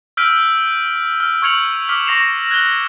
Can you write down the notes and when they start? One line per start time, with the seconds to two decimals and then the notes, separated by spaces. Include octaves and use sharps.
0.17 E6 F6 G6 B6 D7 D#7
1.20 F6
1.42 C#6 F6 G#6 C#7 F7 F#7
1.89 D6 F6 B6
2.06 C#6 A#6 C7 E7 F7
2.50 F#6 G#6 F#7 G7